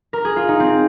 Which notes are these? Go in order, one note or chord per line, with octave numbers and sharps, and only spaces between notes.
A#4
G#4
F4
D#4
C4